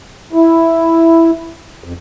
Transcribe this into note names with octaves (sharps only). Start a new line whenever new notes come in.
E4
F2